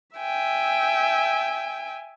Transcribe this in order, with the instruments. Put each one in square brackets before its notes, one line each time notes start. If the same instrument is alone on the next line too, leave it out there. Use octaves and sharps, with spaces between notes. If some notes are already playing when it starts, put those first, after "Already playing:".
[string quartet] E5 G5 G#5